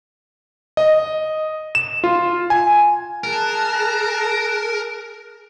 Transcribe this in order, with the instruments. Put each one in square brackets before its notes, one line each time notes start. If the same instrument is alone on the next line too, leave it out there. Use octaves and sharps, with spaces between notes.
[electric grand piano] D#5
E7
F4
G#5
[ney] G#4 [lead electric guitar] A#4 [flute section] A5 F#6